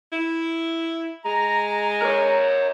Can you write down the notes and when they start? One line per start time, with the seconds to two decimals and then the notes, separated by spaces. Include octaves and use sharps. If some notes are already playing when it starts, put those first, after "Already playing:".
0.12 E4
1.25 G#3 A#5
2.02 A#4 C#5